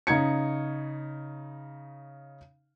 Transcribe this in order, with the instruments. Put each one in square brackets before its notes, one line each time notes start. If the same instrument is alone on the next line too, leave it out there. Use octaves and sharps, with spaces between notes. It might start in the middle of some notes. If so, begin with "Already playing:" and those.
[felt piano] C#3 D#4 G#6 C#7